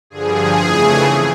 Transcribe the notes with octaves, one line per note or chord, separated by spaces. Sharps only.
G2 D3 F3 G#4
F2 C#3 E3 A3